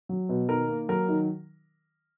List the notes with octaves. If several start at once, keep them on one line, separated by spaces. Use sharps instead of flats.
F#3
B2
D#3 A#4
A#3
F#3 A#4
D#3